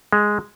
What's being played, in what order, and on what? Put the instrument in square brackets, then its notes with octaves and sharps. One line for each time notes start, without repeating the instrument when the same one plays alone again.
[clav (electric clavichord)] G#3